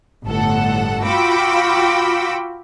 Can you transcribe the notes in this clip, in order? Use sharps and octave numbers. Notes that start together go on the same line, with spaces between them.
G1 A2 A4 F#5
F4 F#4 G5 B5 D6 E6